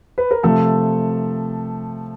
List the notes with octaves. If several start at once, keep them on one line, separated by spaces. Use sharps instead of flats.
B4
A#4
C3 F3 A3 A4